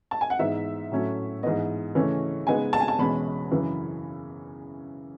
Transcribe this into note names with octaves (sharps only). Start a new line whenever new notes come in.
A5
G#5
F#5
G#2 E3 B3 D#4 E5
A2 F#3 A3 C#4
G#2 E3 B3 D#5
C#3 E3 A3 C#4
C#3 G#3 B3 D#4 G#5
A5
G#5
A5
E2 B2 G#3 C#4 B5
F#2 C#3 E3